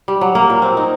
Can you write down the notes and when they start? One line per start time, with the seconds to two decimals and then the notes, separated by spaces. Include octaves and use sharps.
0.08 G3
0.21 F#3
0.35 A#3
0.50 A#2
0.62 C4
0.77 D#4